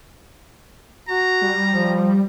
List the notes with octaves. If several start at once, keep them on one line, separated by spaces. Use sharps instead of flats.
F#4 A#5
G3
F3